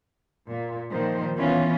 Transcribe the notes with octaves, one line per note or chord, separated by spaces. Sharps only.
A#2
A#2 D#3 F3 C5
E3 B3 C#4 F4